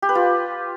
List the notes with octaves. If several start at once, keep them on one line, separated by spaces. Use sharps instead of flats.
G4
B4
F4